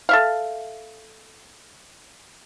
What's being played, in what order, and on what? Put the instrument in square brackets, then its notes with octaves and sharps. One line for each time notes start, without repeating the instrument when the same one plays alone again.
[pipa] A4 E5 F5